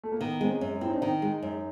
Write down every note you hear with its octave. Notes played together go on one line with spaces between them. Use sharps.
A3
A#3
D#3 B3
G#3 C4
C#4
F#2
C4 E4
D#4
D4
D#3 D#4
G#3
F#2